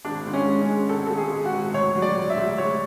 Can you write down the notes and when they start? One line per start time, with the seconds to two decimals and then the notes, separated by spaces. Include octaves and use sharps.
0.05 G#1 D4
0.26 G#2
0.33 C#4
0.47 G#3
0.61 C#4
0.68 G#3
0.89 G#1 A4
1.07 G#1 A4
1.17 G#4
1.31 G#3
1.45 F#4
1.52 G#1
1.73 D2 C#5
1.95 F#3
2.02 D5
2.16 D2
2.30 E5
2.37 D2
2.58 D2 C#5